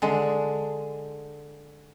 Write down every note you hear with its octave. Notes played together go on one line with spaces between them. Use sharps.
D3 G#3